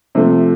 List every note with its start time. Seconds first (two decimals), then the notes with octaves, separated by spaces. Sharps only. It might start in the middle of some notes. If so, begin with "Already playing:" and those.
0.15 C3 F3 A3